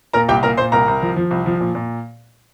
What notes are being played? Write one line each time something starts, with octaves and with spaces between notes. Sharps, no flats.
A#2 A#4 A#5
C2 G4 G5
A#2 A#4 A#5
A#2 C5 C6
C2 A#4 A#5
C2
F3
F3
C2
F3
A#2
A#2